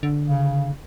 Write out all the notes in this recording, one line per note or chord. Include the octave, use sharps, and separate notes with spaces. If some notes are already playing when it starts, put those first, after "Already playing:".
D3
C#3